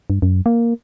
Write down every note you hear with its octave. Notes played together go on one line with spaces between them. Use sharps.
G2
F#2
A#3